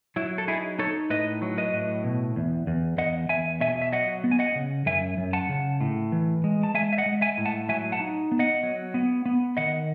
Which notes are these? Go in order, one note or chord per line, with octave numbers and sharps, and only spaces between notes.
F#3 E4
A4
D#4 E4 G#4
D#4 A4 C#5
A2 B4 D#5
F#3
B4 D#5
A2
B2
E2
E2
E2 D#5 F#5
E2 E5 G#5
B2 E5 G#5
E5
F#3 D#5 F#5
B3
G#5
D#5 F#5
C#3
F#2 E5 G#5
F#2
F#5 A5
C#3
A2
E3
G#3
A5
G#3 E5 G#5
E5
D#5 F#5
G#3
E5 G#5
A2
F#5 A5
F#3 E5 G#5
F#5 A5
D#4
B3
D#5 F#5
F#3
B3
B3
D#3 D#5 F#5